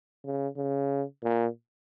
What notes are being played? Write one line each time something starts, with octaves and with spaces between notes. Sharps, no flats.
C#3
C#3
A#2